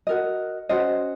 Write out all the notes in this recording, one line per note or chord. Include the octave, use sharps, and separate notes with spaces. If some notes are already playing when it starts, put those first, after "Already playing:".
F#4 A#4 D#5
C#4 F#4 C5 D#5